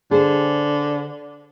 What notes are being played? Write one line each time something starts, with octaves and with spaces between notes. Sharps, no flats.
D3 G#4 C5